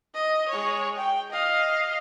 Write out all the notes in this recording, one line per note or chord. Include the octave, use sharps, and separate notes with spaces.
D#5
G#3 C#5
G5
D#5 F5